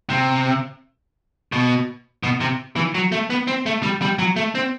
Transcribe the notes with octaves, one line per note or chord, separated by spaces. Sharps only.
C3
B2
B2
C3
E3
F#3
A3
B3
C4
A3
G3
G3
F#3
A3
C4